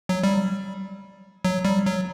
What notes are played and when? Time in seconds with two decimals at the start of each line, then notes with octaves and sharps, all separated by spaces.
0.09 F#3
0.24 G3
1.45 F#3
1.65 G3
1.86 F#3